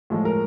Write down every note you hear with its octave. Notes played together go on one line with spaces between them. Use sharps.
A2 F3 G#3
A#4